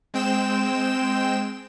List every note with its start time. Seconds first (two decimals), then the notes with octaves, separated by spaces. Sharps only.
0.14 G#3 C4 G5 E7